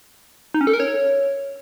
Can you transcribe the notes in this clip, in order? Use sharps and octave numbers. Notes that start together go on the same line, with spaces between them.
D#4
C#4
A4
A#4
C#5